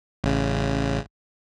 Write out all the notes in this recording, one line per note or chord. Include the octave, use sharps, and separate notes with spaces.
A1 C#3